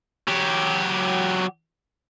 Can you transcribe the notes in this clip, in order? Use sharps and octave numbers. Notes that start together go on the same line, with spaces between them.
F#3 G4